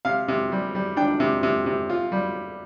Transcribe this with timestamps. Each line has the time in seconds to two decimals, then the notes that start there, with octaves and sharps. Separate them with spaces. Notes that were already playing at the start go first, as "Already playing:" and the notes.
0.05 C3 F5
0.28 C3
0.52 G3
0.75 G3
0.97 D4 G5
1.20 C3
1.43 C3
1.66 C3
1.90 F4
2.12 G3